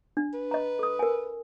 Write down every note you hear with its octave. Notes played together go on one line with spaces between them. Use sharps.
D4
B4
D#5 A#5
A4 D#6
A#4 G#5